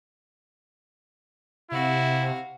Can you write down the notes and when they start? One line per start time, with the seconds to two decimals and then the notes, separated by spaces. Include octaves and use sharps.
1.72 C3 E4 F#4 F5